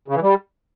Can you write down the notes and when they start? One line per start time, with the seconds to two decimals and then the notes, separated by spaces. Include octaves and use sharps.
0.08 C#3
0.15 E3
0.23 G3